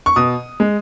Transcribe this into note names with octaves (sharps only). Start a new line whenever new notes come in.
C#6
B2 D#6
G#3